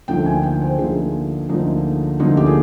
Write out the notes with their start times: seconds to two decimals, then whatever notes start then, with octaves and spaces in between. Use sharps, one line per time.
0.08 D2 D3 F3 A#3 D#4 G5
0.26 G#5
0.43 G5
0.62 C5
0.79 D2 D3 F3 A#3 D#4 G#4
1.49 D2 D3 F3 A#3 D#4
2.20 D2 D3 F3 A#3 D#4 F4
2.37 G4
2.46 G#4